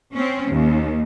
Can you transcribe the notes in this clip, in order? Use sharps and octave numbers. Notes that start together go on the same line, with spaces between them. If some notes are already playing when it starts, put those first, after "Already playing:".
C4 C#4
D#2